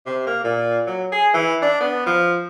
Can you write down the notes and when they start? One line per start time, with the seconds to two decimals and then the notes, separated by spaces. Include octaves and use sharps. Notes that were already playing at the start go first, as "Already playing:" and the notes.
0.06 C3
0.26 A#3
0.44 A#2
0.87 F#3
1.12 G#4
1.34 E3
1.62 D4
1.80 B3
2.06 F3